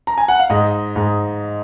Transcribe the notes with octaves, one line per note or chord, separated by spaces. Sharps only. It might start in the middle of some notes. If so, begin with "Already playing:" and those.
A#5
G#5
F#5
F5
G#2 D#5
G#2